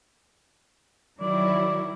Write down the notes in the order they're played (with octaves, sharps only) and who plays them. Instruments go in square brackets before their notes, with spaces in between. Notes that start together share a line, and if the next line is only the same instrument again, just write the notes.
[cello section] D#3 F#3 E4 [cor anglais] D5